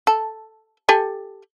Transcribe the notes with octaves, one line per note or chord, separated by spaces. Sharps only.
A4
G4 A4 G#5